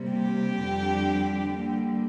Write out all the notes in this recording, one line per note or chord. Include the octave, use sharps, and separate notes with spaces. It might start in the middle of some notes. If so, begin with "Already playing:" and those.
Already playing: C3 G3 A#3
G4
F2 D3 G3 D4
D3 G3 A#3